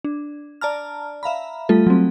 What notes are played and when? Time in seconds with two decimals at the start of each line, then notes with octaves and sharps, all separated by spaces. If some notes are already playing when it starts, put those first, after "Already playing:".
0.04 D4
0.61 D5 A5 A#5 F6
1.23 E5 F5 A#5 B5
1.69 G3 A3 F4 A4
1.87 F#3 C4